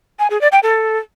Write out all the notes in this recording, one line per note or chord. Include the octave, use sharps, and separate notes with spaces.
G#5
G#4
D5
G5
A4